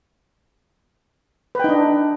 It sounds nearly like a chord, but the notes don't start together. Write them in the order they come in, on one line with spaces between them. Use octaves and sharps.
B4 G5 D#4 D4